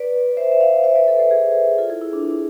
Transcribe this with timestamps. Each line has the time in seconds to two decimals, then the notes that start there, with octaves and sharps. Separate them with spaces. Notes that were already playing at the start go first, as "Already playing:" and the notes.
Already playing: B4 D5
0.37 C5 E5
0.52 E5
0.60 D5 F5
0.84 C5 E5
0.95 B4 D5
1.08 A4 C5
1.19 A4 C5
1.31 G#4 B4
1.78 F4 A4
1.90 E4 G#4
2.02 E4
2.13 D4
2.25 D4